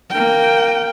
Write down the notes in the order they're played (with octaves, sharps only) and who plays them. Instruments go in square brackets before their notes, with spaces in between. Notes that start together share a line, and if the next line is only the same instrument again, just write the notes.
[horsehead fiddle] A#3 G5